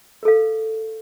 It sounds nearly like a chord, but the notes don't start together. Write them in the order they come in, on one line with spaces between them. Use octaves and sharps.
A#4 A4 F5